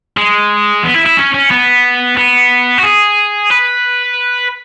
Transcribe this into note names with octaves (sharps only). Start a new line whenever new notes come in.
G#3
B3
E4
E4
C#4
C#4
B3
B3
F#4
G#4
B4